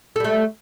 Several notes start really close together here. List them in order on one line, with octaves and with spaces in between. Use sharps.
A4 G3 A3